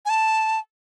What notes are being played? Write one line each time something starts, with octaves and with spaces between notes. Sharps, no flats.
G#5
A5